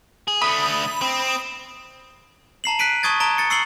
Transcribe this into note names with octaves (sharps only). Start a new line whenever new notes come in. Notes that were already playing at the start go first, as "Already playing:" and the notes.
G#4
D3 A3 B5 D#6
C4
A5 A#5 C7 F#7
F#6 B6 C7 D7 D#7
A5 C#6 D#6 G#6 A6
A5 A#5 D7 G7
A6 C#7
C#6 E6 C7 C#7 F#7 G7